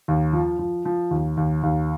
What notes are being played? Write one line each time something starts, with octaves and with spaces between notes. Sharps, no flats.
D#2
F3
F3
F3
D#2
D#2
D#2